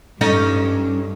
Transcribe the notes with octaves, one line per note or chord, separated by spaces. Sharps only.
G2 C#4 D#4 A4 D#5